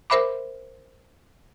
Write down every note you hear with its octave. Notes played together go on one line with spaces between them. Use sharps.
A#4 C5 E5 B5 D6